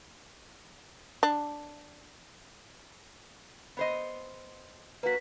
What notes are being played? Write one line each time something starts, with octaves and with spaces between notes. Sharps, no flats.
D4
B3 C5 D#5
A#3 F#4 B4 B6